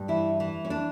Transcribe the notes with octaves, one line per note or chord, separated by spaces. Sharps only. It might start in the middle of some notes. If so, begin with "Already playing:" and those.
Already playing: G2
E3 E4
E3
C#4
D4